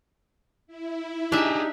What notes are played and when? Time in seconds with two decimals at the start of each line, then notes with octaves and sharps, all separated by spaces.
0.67 E4
1.32 D4 D#4 G4 G#4 E5